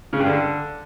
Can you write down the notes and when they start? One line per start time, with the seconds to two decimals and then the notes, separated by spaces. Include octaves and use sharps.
0.13 C#3
0.19 G2
0.26 D3